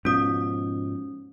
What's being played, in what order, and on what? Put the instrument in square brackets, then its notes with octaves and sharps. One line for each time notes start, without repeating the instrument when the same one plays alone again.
[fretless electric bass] G#2 B2 F3 [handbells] C#4 D#6